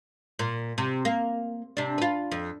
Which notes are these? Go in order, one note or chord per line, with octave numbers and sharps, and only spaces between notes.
A#2
C3
A#3
C3 D4
F4 B4
F2